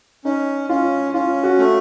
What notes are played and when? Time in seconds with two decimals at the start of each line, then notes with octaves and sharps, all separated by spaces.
0.25 C#4 D#4
0.69 C#4 F4
1.14 C#4 F4
1.43 F#4
1.58 A3